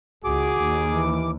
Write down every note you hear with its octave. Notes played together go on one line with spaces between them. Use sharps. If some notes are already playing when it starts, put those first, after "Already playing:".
C#2 F#4 G#4 D6
D#2
E3